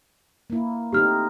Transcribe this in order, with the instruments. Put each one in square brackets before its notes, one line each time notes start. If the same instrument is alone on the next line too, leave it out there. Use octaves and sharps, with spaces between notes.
[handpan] A#3 E4
[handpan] A3 C4 D#4 [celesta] G4 F6